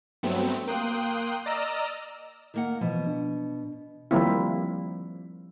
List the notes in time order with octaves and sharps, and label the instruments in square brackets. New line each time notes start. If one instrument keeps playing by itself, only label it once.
[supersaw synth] G2 F#3 A3 B3 C4
A#3 G5 C6 D#6 F#6
D5 D#5 A#5 E6 F6
[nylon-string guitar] D#3 A#3 F#5
[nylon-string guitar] B2 [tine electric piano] E3 F3
[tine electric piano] D4
[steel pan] D#3 F3 G3 A#3 C4 E4